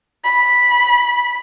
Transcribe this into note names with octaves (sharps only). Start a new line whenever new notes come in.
B5